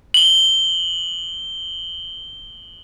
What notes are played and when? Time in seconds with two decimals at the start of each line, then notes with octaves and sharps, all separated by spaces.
0.14 F#7 G7